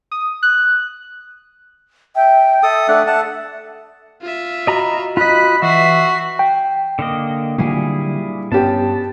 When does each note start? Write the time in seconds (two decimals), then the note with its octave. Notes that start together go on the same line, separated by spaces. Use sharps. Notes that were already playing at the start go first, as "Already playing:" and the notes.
0.11 D#6
0.43 F#6
2.16 E5 G5
2.63 A4 E5 D#6
2.88 A3 D4 A4 F#5
3.07 F#5 A5
4.22 F4 E5
4.67 F#4 D#5 A#5 B5
5.17 F4 D#5 B5 F#6 B6
5.62 E3 F#4 E5 B6 C7
6.39 G5
6.99 D3 A#3 D#5
7.58 A#2 D3 F#3 G3 A#3 E4 G#4
8.52 G2 B3 C#4 G4 A5